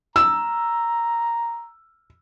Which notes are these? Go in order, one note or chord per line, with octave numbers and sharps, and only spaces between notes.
A#5 E6